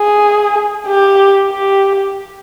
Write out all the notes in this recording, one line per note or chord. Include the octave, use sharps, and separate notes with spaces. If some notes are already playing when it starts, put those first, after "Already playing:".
Already playing: G#4
G4
G4